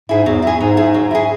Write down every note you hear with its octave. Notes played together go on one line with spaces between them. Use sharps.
G#2 E4 G#4
E2 F#3
E4 G#4
G#2 F#3
E4 G#4
F#3
E4 G#4